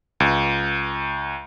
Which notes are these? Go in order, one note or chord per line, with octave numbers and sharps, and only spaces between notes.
C#2